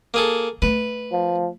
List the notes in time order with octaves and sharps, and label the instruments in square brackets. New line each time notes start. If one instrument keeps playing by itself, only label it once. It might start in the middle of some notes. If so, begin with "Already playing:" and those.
[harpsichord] A#3 G#4 A4
[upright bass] A3 [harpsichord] B4
[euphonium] F3